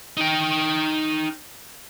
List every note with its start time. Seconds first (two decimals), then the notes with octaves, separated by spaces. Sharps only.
0.17 D#4 G5